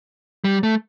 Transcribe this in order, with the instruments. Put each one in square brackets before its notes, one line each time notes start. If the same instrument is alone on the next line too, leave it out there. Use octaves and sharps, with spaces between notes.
[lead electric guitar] G3
A3